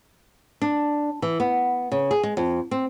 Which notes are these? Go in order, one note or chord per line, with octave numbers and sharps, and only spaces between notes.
D4
E3
B3
C#3
G#4
G#3
F2
C4